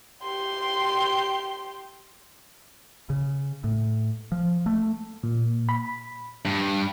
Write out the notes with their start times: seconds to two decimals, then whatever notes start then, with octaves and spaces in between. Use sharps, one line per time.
0.23 G4 C6
3.10 C#3
3.64 A2
4.32 F3
4.66 A3
5.23 A#2
5.69 B5
6.45 G2